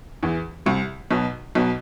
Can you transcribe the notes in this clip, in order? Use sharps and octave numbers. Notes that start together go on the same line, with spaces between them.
E2 E3
C2 C3
B1 B2
B1 B2